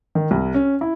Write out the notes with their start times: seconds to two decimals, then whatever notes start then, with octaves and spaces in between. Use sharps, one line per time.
0.15 D#3
0.31 C2
0.54 C#4
0.81 E4